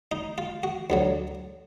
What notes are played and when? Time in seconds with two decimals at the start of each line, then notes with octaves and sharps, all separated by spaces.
0.12 D#4
0.38 F4
0.63 F#4
0.90 D2 D3 F#3